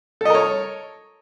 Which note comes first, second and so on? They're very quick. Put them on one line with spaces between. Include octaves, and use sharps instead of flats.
A4 D#5 A#4 C#5